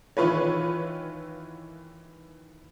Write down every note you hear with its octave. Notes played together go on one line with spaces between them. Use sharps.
D#3 E3 E4 F4 B4 C#5